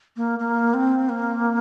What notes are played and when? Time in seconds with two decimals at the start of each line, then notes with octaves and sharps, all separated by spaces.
0.17 A#3
0.39 A#3
0.74 C4
1.09 A#3